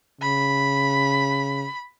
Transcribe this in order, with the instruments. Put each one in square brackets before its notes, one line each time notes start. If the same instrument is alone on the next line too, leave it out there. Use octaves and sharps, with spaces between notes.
[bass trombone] C#3 [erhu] B5